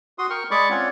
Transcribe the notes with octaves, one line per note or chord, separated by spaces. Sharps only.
F#4 C6 D#6
A#4 G5 C#6 F6
G#3 G#4 D5 B5 C#6 D6
C4 C#4 F4 C#5 D5 F#5